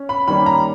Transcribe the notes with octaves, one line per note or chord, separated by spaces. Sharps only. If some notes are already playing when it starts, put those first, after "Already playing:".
Already playing: C#4
B5
D#3 G3 A#3 C#4 B5
A#5